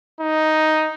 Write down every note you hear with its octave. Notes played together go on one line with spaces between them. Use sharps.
D#4